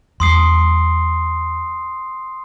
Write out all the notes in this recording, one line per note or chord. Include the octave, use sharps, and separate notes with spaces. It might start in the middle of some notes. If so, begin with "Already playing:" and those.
E2 G3 C6 D#6 C7